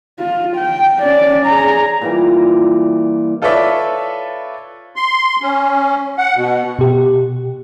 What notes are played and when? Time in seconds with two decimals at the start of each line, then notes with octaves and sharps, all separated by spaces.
0.20 F4
0.57 G5
1.01 C#4 D5
1.46 G#4 A#5
2.01 A#2 E3 G3
3.42 F4 A4 B4 C#5 D5 E5
4.96 C6
5.42 C#4
6.18 F#5
6.37 B2
6.79 B2 G4